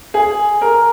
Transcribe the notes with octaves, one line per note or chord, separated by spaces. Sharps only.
G#4
A#4